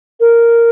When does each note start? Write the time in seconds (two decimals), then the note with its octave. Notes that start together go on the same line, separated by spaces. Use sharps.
0.20 A#4